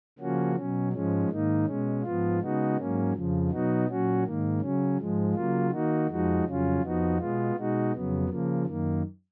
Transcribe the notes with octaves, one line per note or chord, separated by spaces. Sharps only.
C#3 F3 A#3 C#4 F#4
B2 F#3 C#4
G#2 F3 G#3 C#4
G#2 D#3 A#3 D#4
B2 G#3 C#4
G#2 F3 B3 F4
C#3 G#3 B3 D#4 F#4
G#2 F#3 A#3 C#4
F2 C#3 F3
B2 F#3 B3 D#4 F#4
A#2 F#3 C#4 F#4
G#2 D#3 A#3
C#3 F#3 C#4
G#2 F3 G#3
C#3 F#3 A#3 F4
D#3 A#3 D#4 F#4
F2 F3 G#3 D#4 F#4
F2 C#3 F#3 C#4 F4
F2 F3 B3 D#4 F#4
B2 G#3 B3 F4
B2 G#3 D#4 F#4
F2 C#3 F#3 B3
C#3 F3 A#3
F#2 D#3 A#3